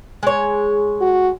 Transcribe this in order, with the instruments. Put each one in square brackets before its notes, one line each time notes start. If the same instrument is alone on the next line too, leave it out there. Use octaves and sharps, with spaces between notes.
[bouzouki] G#3 C#5
[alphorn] F#4